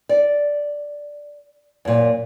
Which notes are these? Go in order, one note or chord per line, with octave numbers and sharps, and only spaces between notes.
D5
F#2 A#2